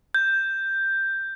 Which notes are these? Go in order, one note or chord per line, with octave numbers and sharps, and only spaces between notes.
G6